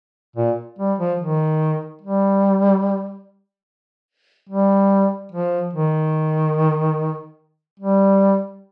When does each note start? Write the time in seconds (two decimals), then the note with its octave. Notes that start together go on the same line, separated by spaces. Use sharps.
0.36 A#2
0.79 G3
0.99 F3
1.20 D#3
2.02 G3
4.49 G3
5.32 F3
5.74 D#3
7.80 G3